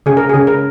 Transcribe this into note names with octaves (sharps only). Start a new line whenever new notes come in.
C#3 G#4
A#4
C#3 G#4
A#4